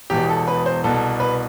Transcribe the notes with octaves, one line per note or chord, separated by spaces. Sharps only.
E1 E2 B2 G4
A4
B4
C5
C2 B2 A4
B4